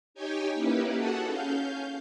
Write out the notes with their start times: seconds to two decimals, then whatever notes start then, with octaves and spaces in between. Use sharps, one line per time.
0.14 D#4 G4 C#5 G5 G#5
0.54 A#3 C#4 D#4 E4 G4 B4
0.95 F#4 G#4 A4 F#5 A5
1.27 C#4 F5 G6